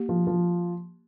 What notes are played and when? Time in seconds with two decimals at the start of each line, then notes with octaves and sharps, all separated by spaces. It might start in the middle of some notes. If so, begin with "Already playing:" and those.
Already playing: A#3 G4
0.09 F3
0.27 F3